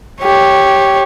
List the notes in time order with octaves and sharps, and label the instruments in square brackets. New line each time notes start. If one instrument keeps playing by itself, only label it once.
[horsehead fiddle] G4 C#5